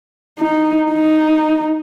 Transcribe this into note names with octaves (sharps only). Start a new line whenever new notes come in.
D#4
D#4